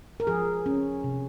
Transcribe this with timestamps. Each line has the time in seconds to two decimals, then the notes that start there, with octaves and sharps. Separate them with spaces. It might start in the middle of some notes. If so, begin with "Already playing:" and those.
0.20 A#4
0.27 F3 G#4
0.66 C#4
1.04 C3